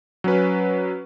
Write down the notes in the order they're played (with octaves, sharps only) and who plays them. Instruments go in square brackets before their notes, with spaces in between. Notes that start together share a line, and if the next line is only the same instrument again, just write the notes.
[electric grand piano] F#3 C#4 B4